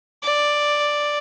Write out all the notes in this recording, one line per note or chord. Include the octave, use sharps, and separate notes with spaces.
D5